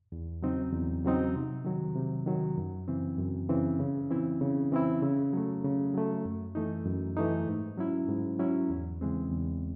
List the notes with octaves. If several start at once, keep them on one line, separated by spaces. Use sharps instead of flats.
E2
C#3 F#3 C4 D#4
E2
C#3 F#3 C4 D#4
C3
D#3 F#3
C3
D#3 F#3
F#2
C#3 E3 C4
F#2
C#3 E3 C4
C#3
E3 C4 E4
C#3
E3 C4 E4
C#3
F#3 A3
C#3
F#3 A3
F#2
E3 A3 D#4
F#2
E3 A3 D#4
G#2
F#3 C#4 E4
G#2
F#3 C#4 E4
E2
C#3 E3 G#3 C4
E2